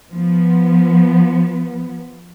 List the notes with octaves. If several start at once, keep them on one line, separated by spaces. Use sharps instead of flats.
F3 B3